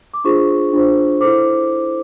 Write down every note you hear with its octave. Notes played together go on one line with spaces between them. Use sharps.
D6
D4 F4 G#4 C5 C#6
D4 F4 G#4 C5
E4 A4 C5 D6